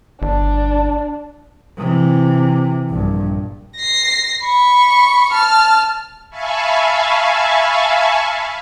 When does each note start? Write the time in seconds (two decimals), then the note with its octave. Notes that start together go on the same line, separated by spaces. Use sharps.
0.22 G1 D4
1.77 C3 E3
2.89 A#1 G2
3.77 A#6 C7
4.44 B5 C#6
5.33 A5 F6
6.30 E5 F5 G#5 A5 B5 C#6